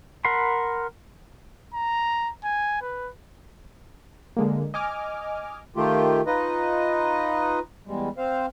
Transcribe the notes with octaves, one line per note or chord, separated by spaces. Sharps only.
A#4 F#5 B5 C6
A#5
G#5
B4
D3 G#3 A#3
D#5 G#5 D6 F6
D#3 A3 F4 G4
D#4 F4 B4 D#5
E2 G3 G#3
C4 C5 F5